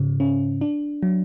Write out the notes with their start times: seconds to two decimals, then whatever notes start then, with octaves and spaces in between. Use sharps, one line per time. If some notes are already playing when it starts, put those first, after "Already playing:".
Already playing: G#2 C#3
0.20 C#4
0.61 D4
1.03 F#3